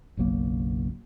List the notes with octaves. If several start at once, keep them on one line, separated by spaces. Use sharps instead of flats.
F#1 B1 F#3 A#3